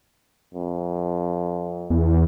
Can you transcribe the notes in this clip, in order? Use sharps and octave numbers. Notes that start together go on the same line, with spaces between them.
F2
E2